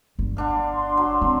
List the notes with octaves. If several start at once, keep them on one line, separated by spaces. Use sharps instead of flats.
G1
D3 D4 F5
C6
F#3
C4